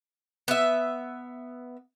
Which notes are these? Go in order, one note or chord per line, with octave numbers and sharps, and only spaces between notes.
B3 E5